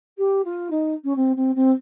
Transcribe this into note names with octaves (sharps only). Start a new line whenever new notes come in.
G4
F4
D#4
C#4
C4
C4
C4